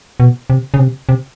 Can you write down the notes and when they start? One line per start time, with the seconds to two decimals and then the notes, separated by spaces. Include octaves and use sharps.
0.20 B2
0.50 C3
0.74 C#3
0.79 C3
1.09 C3